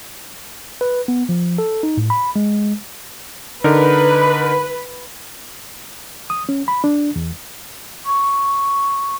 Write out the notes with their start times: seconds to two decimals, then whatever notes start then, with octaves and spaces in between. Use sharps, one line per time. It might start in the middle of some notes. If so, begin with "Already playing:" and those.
0.81 B4
1.08 B3
1.29 F3
1.58 A4
1.83 D#4
1.97 A2
2.10 B5
2.36 G#3
3.64 D3 D#4 A#4 B4
6.30 D#6
6.49 C#4
6.68 B5
6.84 D4
7.16 E2
8.06 C#6